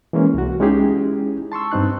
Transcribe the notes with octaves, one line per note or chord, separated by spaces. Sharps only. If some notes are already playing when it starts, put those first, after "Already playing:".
E3 G#3 A#3 C#4
C2 F#4
G#3 C#4 D#4 E4 G4 G#4
A5 C6 C#6 E6
G2 C4 D#4 F#6